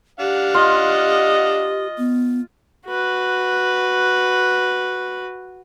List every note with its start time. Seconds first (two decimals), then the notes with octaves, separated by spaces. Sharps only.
0.20 D4 G4 F5 F#5
0.54 F4 D#5
1.98 B3
2.87 F#4 B4